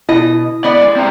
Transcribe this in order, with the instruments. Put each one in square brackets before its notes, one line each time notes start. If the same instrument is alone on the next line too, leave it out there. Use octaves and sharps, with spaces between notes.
[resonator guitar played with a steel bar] B2 D#5 [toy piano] E4
[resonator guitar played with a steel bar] B3 D#5 [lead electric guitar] D5
[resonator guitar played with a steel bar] G#3
[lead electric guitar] C4 A#5